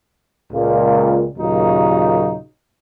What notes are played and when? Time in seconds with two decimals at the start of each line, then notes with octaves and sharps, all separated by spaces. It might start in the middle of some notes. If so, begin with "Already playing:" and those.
0.52 C#2 A#2
1.38 D#2 A#2 C#3 F#3 D#4